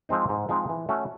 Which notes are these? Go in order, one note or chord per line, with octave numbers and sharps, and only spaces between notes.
F3 G#3 C4 D#4
G#2
F3 G#3 C4 D#4
E3
A3 C#4 F#4